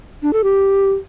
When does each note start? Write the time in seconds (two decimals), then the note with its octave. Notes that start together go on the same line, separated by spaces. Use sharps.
0.23 D4
0.33 A4
0.44 G4